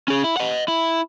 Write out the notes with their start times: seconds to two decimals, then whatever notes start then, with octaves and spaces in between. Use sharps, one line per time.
0.08 C#4 G#4
0.24 E4
0.37 D#5 F#5
0.68 E4